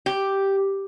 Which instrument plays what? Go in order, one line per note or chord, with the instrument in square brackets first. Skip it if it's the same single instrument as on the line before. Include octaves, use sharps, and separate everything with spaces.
[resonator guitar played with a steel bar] G4